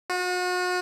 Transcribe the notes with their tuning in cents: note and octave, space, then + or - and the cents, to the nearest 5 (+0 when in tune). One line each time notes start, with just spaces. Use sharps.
F#4 -40